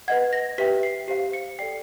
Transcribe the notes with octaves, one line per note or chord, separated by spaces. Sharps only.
B4 D#5 F#5 G#6
A#6
G4 B4 E5 G5 B6
C7
G4 C5 F5 C7
C#7
A4 D5 G5 C7